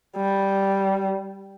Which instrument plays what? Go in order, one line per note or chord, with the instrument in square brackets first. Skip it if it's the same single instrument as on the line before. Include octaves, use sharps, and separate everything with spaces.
[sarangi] G3